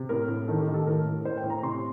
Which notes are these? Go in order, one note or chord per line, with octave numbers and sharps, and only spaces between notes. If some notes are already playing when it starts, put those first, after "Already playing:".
Already playing: C3
A2 A#4
A2
D#3 A4
G4
D#3
A4
A2 A#4
A2
A2 C5
G5
A2
A#5
C3 C6